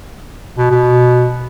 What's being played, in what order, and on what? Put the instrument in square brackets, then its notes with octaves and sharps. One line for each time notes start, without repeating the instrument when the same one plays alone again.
[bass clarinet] B2
B2